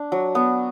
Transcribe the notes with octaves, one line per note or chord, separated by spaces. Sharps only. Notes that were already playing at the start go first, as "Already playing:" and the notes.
Already playing: D4
F#3
B3